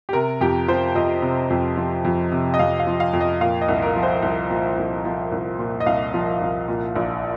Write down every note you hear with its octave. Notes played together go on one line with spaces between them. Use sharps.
G4
C3 A#4
F2 G4
F3 C5
F2 D#5
C3
F2
F3
F2
C3
D#5
F2 F5
F5
F3
F5
F2
D#5
A#2 F5
D#5
C2
A#4
F3
C5
C2
A#2
C2
F3
C2
A#2
D#5
C2 F5
F3
C2
A#2
A#1